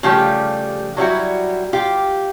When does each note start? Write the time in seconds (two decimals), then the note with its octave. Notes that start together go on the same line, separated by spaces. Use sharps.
0.03 C#3 F3 G3 A3 G4
0.97 F#3 G3 E4 F#4
1.73 F4 G4